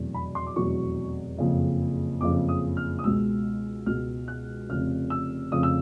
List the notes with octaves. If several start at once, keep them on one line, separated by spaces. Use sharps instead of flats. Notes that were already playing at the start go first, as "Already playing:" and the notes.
Already playing: F1 E2 B2 F#3
B5
C6
D6
F1 E2 B2 F#3 C#6
F#1 F2 C#3
F#1 F2 C#3 D6
D#6
F6
D#6
C#2 B2 G#3 E6
C#2 B2 G#3 F6
F#6
F1 F2 C#3 F6
E6
F1 F2 C#3 D#6
E6